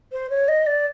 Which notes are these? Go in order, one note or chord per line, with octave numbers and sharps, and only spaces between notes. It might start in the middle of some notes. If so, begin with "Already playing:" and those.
C5
C#5
D#5
D5